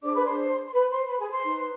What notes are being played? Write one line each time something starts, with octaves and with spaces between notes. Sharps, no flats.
D4 G#4 C5 D5 D6
B4 B5
C5 C6
C6
B4 B5
C5 C6
B4 B5
G#4 G#5
C5 C6
D#4 B4